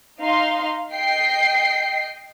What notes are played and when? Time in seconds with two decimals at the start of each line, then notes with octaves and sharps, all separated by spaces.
0.20 D#4 F5 C6
0.93 D#5 G5 C7